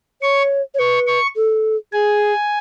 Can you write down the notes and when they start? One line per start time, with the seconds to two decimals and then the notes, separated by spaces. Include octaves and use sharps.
0.22 C#5 C#6
0.74 C#5
0.79 B4 C#6
1.07 C#6
1.36 A4
1.93 G#4 G#5